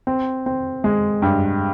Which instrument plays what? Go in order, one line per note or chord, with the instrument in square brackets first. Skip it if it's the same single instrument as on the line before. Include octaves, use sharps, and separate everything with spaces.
[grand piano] C4
C4
G#3
G2